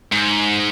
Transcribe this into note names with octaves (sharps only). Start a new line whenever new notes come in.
G#2